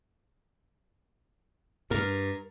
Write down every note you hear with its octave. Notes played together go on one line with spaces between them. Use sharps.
G2 A#4